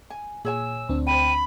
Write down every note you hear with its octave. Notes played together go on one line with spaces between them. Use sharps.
G#5
A#2 G#4 C#5 G#5 E6
D2 C4 D4
C5 G5 B5 D#7